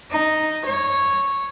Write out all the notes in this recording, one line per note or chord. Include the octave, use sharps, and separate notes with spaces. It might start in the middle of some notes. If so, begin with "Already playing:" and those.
D#4
C#5